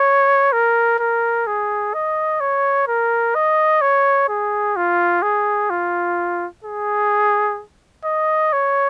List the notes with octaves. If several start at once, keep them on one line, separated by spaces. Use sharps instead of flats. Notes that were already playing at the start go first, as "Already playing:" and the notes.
Already playing: C#5
A#4
A#4
G#4
D#5
C#5
A#4
D#5
C#5
G#4
F4
G#4
F4
G#4
D#5
C#5